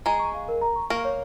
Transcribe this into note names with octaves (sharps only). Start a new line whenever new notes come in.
G#3 G#4 A#5
C#6
F5
A#4
A#5
C#6
A#3 A#4 C#6
C#5